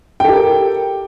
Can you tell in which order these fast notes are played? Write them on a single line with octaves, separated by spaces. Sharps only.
G5 A4 G4 A#4